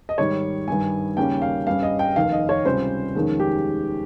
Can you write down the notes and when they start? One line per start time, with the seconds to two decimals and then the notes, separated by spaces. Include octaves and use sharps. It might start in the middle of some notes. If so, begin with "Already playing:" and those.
0.09 D#5
0.18 G#2 D#3 G3 C#5
0.68 G2 D#3 G3 G#5
1.17 D#2 C#3 G3 A#3 C#4 G5
1.42 F5
1.67 G2 G3 C#4 F5
1.83 D#5
1.99 G5
2.16 F1 D#2 D#3 F5
2.32 D#5
2.49 C#5
2.65 C#2 C3 G3 C#4 C5
3.15 F1 D#2 D#3 G#3 C#4
3.40 G4